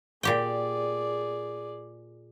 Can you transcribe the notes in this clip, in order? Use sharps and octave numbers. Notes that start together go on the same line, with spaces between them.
A#2 G4 G#4 D5 G5